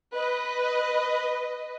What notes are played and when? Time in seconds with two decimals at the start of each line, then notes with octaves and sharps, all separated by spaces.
0.15 B4 D#5